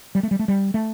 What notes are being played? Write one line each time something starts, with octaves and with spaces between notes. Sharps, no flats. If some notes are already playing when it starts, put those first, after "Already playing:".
G3
A3
G3
A3
G3
A3